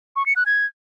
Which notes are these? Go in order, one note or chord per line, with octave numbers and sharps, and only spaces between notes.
C#6
C#7
F#6
G#6